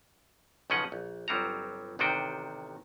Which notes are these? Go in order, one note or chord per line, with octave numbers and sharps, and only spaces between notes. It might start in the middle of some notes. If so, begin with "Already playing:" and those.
B1 C#3 F3 C#4 D#5 F#5
A#1
G1 F#3 G3 C4 F#4 A#5
A1 C3 D#3 D4 F#4 G5